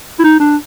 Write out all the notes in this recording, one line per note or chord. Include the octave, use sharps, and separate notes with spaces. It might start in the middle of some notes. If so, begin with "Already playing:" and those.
E4
D#4
D4